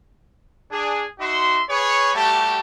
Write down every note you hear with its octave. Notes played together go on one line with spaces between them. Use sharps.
D4 G#4
D#4 F#4 E5 C6
G#4 B4 C#5
G3 A3 F#4 G4 A5